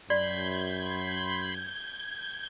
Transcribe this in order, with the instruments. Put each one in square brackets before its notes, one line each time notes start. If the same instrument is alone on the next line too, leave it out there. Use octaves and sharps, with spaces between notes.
[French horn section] F#2 [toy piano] D5 [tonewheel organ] B5 C6 [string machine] G6 G#6